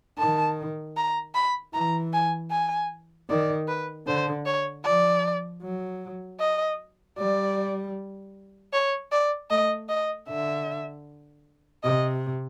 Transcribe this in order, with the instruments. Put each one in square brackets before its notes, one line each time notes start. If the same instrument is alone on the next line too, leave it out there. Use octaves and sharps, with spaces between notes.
[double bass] D#3 [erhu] A5
[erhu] A#5
B5
[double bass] E3 [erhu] A#5
[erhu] G#5
G#5
[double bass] D#3 [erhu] D5
[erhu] B4
[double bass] D3 [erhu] C5
[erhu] C#5
[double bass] F3 [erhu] D5
[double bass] F#3
[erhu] D#5
[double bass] G3 [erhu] D5
[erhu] C#5
D5
[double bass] A3 [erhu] D#5
[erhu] D#5
[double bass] D3 [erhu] E5
[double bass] C3 [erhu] D#5